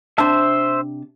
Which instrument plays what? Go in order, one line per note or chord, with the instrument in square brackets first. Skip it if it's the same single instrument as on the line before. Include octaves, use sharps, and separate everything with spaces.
[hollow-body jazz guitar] C3 D4 A5 [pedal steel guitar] C5 E5